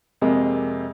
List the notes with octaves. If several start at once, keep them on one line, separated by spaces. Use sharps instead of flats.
F2 C3 G#3 A#3